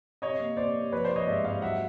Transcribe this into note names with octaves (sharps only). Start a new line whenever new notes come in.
C3 C#5 D#5
A#3
C3 C5 D5
C3
F3 B4 C#5
C5 D5
F3
C#5 D#5
G#2 D5 E5
G#2 D#5 F5
F#3 E5 F#5